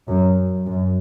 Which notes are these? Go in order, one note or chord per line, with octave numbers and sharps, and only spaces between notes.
F#2
F#2